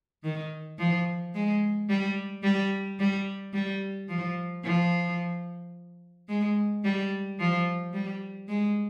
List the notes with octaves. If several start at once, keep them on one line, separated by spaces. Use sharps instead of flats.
D#3
F3
G#3
G3
G3
G3
G3
F3
F3
G#3
G3
F3
G3
G#3